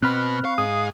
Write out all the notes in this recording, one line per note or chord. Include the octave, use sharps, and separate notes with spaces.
B2 C4 B4 B5 F6 F#6
F5 C#6
G#2 G#4 D#6